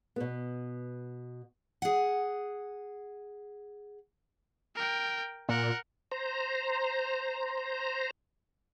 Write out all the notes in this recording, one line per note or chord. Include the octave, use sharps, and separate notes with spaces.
B2 B3
G#4 F#5
A#4 G5
A#2 A#4 F#5
C5 A#5